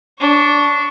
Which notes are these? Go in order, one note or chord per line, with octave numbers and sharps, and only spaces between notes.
D4 C#6